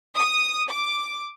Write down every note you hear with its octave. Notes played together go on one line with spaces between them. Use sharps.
D#6
D6